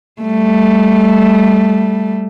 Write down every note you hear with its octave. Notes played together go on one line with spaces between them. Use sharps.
G3 A3